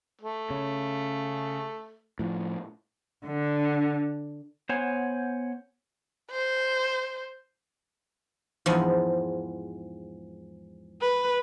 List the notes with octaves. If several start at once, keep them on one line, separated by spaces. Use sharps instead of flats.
A3
C#3
A2 F3
D3
B3 C5 C#5 F#5 G#5
C5
E2 G#2 F3
B4